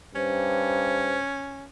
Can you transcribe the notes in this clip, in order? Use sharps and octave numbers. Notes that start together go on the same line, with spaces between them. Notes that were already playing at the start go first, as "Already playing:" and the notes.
G2 C#4 C5